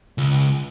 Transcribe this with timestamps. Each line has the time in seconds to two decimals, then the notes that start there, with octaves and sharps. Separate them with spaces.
0.18 C#2